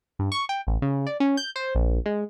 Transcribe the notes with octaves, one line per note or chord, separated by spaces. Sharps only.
G2
C#6
G5
A1
C#3
D5
C#4
G6
C5
A#1
G#3